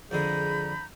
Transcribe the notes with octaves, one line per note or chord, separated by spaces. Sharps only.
F2 D3 G#3 G#4 A#5 B5 G6